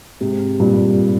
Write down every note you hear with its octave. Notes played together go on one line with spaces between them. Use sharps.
G#2 C3
G2 A#2